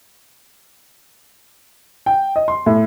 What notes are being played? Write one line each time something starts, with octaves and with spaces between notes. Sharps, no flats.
G5
D#5
C6
A2